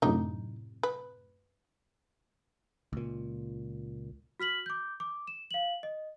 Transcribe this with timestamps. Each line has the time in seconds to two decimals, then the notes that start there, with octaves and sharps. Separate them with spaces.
0.02 F#2 A2 C3 D4 D#4
0.83 B4
2.93 C#2 A#2
4.40 F#4 F6 B6 F#7
4.66 D6 G6
5.00 D6
5.27 E7
5.51 F5 F#7
5.83 D#5